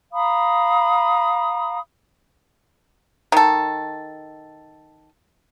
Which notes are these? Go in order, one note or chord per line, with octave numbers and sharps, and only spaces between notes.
F5 A#5 B5 D#6
D#3 A4